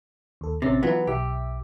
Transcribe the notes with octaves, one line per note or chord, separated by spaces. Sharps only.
D#2 A4
A1 C3 C#4 A6
E3 F#3 B3 E4 F4
B1 G4 E5